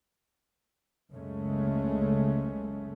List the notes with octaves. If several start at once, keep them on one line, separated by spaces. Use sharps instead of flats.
F#1 C#2 C#3 G#3 A3 C#4